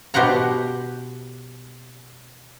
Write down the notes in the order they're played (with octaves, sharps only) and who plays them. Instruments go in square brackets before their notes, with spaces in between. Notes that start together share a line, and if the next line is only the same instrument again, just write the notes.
[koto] B2 G4 C5 F#5 A#5